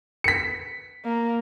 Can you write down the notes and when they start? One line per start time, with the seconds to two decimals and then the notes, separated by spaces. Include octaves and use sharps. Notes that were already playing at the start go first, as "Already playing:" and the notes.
0.24 B6 C#7
1.05 A#3